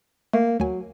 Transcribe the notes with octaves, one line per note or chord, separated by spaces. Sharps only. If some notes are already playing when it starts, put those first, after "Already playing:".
A3 A#3
D2 F#3 G#5